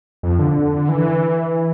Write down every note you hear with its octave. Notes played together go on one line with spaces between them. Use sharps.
F2
D3
E3